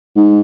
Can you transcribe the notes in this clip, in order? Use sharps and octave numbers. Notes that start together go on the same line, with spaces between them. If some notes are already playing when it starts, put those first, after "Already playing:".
G#2